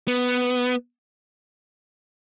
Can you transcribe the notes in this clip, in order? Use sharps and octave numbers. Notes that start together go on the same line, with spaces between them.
B3